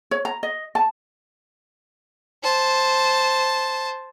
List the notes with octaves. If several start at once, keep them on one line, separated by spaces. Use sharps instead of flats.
C#5
A#5
D#5
A5
C5 A5